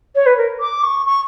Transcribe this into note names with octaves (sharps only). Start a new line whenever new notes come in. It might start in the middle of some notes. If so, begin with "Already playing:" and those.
C#5
B4
A#4
D6
C#6
C#6